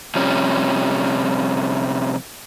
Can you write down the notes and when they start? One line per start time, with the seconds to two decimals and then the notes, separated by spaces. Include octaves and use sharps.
0.15 C3 F3 G3 C#4